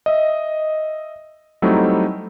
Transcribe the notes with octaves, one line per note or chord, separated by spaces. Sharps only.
D#5 E5
F#3 G3 A3 C4 D#4 E4